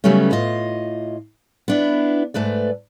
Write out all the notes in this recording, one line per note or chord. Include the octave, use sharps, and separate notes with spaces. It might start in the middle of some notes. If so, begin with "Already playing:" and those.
C#3 F#3 G3 A3 B3 C#4
A2 F4 D#5
B3 D4 E4
G#2 A3 B4 D5